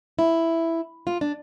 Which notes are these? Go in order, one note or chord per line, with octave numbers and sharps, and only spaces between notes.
E4
F4
D4